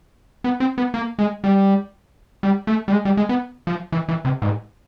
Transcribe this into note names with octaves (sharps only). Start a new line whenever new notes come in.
B3
C4
B3
A#3
G#3
G3
G3
A3
G3
G#3
G3
G#3
B3
F3
E3
E3
C3
G#2